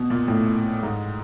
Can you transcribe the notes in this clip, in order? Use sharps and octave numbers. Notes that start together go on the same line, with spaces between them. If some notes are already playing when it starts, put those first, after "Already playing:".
Already playing: B2
A#2
A2
G#2